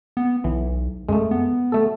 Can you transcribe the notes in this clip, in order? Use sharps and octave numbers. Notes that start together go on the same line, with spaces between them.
B3
B1 E3
F#2 G#3 A3
B3
A3 A4